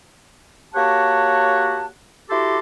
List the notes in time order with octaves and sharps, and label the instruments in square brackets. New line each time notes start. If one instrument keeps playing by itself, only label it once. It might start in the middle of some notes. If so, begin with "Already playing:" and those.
[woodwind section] A#3 F#4 G4 C#5 F#5 A5
E4 F#4 G4 A4 C6 D6